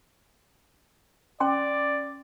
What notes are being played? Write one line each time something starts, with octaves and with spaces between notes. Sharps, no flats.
C#4 D5 G5 C6